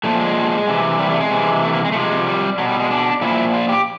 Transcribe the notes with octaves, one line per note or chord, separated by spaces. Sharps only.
A#2 F3 A3
G#3
C3 E3
G3
A3
G#3
C3 E3
A3
A#3
G#3
A3
C3 F3 G#3
G3
B2 F#3
G3
G#3
D4
A#2 F3 E4
F4
G4